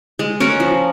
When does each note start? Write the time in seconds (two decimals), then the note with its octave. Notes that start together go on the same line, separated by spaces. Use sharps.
0.19 G#3
0.40 C#4 F#4 A#4
0.60 F3